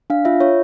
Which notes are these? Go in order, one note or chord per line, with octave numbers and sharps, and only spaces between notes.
D4 F5
F4 E5
F4 C#5